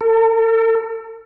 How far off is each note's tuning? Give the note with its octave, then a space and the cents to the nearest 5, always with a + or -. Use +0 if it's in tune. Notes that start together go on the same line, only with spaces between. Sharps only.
A4 +45